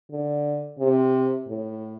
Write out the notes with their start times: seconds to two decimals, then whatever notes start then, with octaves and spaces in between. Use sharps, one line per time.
0.11 D3
0.79 C3
1.48 A2